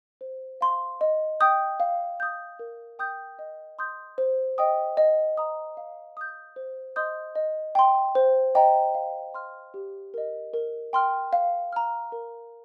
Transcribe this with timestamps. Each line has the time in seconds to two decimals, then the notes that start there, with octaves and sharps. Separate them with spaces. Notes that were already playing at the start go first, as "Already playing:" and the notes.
0.21 C5
0.61 F5 C6
1.01 D#5
1.40 G5 D#6 G6
1.80 F5
2.20 D#6 G6
2.59 A#4
2.99 G5 D#6 G6
3.39 D#5
3.79 C6 D#6 G6
4.18 C5
4.58 D#5 G5 D#6
4.97 D#5
5.37 A#5 D#6
5.77 F5
6.17 D#6 G6
6.56 C5
6.96 D#5 C6 D#6 G6
7.35 D#5
7.75 G5 C6
8.15 C5
8.55 D#5 G5 A#5
8.95 F5
9.34 C6 F6
9.74 G4
10.14 A#4 D#5
10.54 A#4
10.93 G5 C6 F6
11.33 F5
11.73 A#5 F6
12.12 A#4